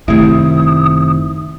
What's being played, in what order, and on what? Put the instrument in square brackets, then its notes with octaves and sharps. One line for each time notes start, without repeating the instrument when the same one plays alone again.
[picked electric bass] F#1 C3 D#3 [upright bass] A3 [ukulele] E4 [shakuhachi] D#6